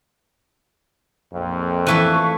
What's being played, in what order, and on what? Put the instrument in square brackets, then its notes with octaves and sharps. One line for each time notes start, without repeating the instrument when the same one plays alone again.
[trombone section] A#1 F2
[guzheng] E3 A3 B4 [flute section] E4 F5 C#6